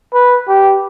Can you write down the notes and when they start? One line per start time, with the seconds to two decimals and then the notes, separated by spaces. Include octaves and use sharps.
0.14 B4
0.48 G4